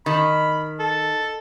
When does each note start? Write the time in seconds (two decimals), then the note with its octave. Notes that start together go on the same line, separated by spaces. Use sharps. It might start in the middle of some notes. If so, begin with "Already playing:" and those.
0.06 D#3 B5
0.79 A4